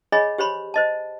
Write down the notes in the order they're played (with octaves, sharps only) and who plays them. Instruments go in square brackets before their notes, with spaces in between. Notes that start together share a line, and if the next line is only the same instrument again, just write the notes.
[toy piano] G#4 C#5 D#5 G#5 B5
G4 C5 C#5 B5 C6
C5 D#5 A5